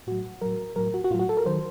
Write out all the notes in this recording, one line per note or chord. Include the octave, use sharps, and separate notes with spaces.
A2 F#3 F#4
A2 F#3 A#4
A2 F#3 A#4
F#4
F#4
A2 F#3 F4
F#4
A4
A#4
D#3 F#3 C5